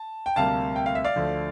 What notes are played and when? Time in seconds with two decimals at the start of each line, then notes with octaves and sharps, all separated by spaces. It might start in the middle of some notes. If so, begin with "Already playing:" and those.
Already playing: A5
0.26 G5
0.36 D2 C3 G3 A#3 F5 A5
0.76 G5
0.86 F5
0.95 E5
1.04 D5 F5
1.16 D2 D3 F3 A3